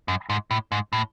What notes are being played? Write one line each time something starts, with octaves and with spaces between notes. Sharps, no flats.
F#2
G#2
A2
G#2
A2